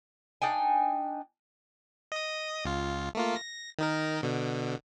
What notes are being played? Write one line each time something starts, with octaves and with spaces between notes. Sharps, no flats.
D4 D#4 G5 G#5
D#5 D#6
C#2 F4
A3 A#3 F4
A#6
D#3 D#4 A#4
B2 D3